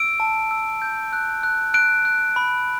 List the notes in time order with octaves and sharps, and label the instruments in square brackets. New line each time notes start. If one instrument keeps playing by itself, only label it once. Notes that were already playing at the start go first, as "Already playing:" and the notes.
Already playing: [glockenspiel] E6 D7
A5
E6
G6
F#6
F#6
F#6 D7
F#6
B5